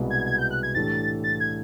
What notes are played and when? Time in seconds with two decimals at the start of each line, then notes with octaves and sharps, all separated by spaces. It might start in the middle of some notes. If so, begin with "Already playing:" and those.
Already playing: C2 B2 G#3 B3
0.10 G#6
0.26 G#6
0.38 G6
0.51 F#6
0.63 G#6
0.75 A2 E3 A3 D4 G4 A6
1.24 A6
1.40 G#6